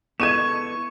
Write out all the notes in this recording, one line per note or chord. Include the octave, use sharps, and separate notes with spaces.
B3 E4 A4 C#6 G#6 D#7 E7